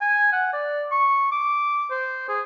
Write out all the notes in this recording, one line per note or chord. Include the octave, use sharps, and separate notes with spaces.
G#5
F#5
D5
C#6
D6
C5
G#4